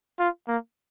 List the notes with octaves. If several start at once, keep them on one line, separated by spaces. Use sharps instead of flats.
F4
A#3